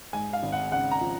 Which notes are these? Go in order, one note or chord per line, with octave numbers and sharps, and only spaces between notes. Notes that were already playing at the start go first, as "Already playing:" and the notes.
G#2 G#5
F5
G#1
F#5
C#3 F#5
A#5
F3